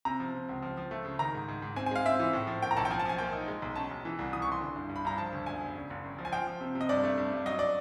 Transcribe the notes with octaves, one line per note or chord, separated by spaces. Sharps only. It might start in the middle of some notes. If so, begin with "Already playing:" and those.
C3 A#5
F3
C3
C#2
F3
F3
A3
C#3
D#3 A#5
G#2
G#2
G#2
C4 G#5
G#5
G#3 F5
C4 E5
E3
A2
F3
A#3 G5
A#5
B1 A5
G5
F3 G#5
A5
F3 G#5
A#3 G5
D#4
G#3
B1
C#4 A5
B1
E3
C2
E3 D#6
C#6
E3 C6
D3
G2
G2
B5
G2 A#5
F3 A5
D2
E1 G#5
E1
C#3
F#1
F#2
F3
G#5
F3 G5
F3
C3
C3
D#5
G2 D5
A3
G2
G2
F#3 D#5
D5